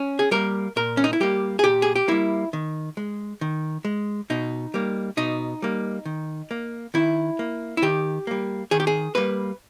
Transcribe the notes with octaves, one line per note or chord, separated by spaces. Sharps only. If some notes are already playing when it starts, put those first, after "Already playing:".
Already playing: C#4
G#4
G3 A#3 A#4
A#2 A#4
C#4
D#4
E4
G3 A#3 G4
G#4
A#2 G4
G#4
G4
G3 A#3 E4
D#3
G#3
D#3
G#3
B2 D#4
G3 A#3
B2 D#4
G3 A#3
D#3
A#3
D#3 E4
A#3
E4
D#3 G4
G3 A#3
D#3 G#4
G4
G#4
G3 A#3 B4